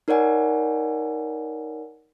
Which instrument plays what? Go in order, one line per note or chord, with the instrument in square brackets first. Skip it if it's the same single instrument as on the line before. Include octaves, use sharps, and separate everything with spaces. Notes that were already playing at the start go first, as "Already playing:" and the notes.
[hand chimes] D#4 A#4 C#5 D5 F#5 G#5